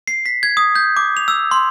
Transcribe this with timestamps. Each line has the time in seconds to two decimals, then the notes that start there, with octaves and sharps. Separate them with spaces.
0.08 C7
0.26 B6
0.43 G#6
0.57 D#6
0.76 G6
0.97 D6
1.17 F7
1.28 E6
1.51 C6